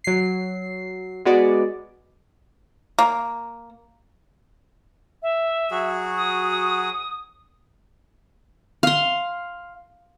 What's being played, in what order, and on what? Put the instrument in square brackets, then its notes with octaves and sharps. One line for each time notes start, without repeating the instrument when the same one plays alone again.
[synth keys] F#3 C7
G#3 B3 F#4 D5
[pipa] A#3
[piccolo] E5
[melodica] F#3 F#4 G#4
[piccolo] D#6
[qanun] F5 C6